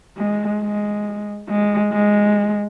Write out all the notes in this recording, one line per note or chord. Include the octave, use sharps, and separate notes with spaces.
G#3
G#3
G#3
G#3